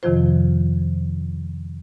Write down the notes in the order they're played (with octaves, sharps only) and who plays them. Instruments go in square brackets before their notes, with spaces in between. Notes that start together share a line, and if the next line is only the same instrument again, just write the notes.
[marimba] F2 C3 D#3 F3 F4 C5